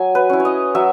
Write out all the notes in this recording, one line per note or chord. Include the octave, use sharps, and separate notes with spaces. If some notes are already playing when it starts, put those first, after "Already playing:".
Already playing: F#3 G#5
B4
C#4 E4
C#5
D#5
F#3 E5